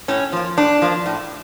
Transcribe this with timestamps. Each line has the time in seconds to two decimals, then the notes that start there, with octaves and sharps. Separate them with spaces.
0.08 A2 C#4
0.32 F3 A#3
0.57 A2 D4
0.82 F3 A#3
1.06 A2